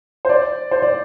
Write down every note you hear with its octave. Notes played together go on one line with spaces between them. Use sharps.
C5
D5
C5
D5